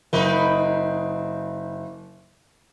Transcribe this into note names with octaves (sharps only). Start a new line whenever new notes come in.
F#1 C4 D#4 B4